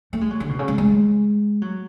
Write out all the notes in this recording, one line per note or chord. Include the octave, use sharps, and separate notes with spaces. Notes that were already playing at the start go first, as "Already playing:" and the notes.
A3
G#3
F#3
D3
B2
C#3
G#3
G#3
F#3